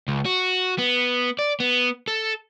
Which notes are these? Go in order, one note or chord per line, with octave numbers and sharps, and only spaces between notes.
C#2
F#4
B3
D5
B3
A4